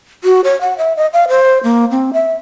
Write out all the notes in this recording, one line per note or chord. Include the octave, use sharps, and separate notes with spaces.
F#4
C#5
F#5
E5
D#5
F5
C5
A#3
C4
E5